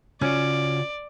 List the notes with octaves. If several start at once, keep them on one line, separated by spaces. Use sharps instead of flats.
C#3 C#4 F4 F#4 D5